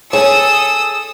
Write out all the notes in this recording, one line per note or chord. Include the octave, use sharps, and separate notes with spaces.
G#4 A4 C#5 D#6 E6